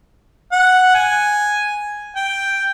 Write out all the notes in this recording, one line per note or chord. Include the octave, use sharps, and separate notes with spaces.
F#5
G#5
G5